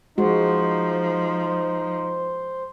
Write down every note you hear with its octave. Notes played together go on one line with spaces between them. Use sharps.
F3 G#3 D#4 F#4 C5